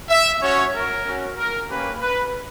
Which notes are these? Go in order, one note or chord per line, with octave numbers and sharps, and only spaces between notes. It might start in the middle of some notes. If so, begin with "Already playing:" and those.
E5
C#4 F#4 C#5
A#4
C#4 F#4
A#4
A#3 C#4 G4 B4
B4